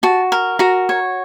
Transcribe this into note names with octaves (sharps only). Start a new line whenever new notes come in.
F#4 A5
A#4
F#4 A#5
C#5